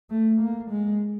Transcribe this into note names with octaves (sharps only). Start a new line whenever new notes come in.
A3
A#3
G#3